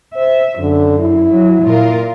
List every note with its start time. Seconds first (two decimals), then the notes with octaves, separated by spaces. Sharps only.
0.16 C5 E5
0.59 F#2 D3
0.99 E4
1.33 F#3
1.65 A#2 F4 A#4